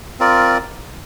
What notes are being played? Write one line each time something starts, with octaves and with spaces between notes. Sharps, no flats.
C4 F4 A#4 D5